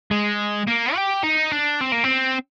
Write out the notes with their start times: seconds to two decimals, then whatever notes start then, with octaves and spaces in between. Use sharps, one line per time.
0.11 G#3
0.68 A#3
0.96 G4
1.24 D#4
1.52 D4
1.81 C4
1.92 A#3
2.04 C4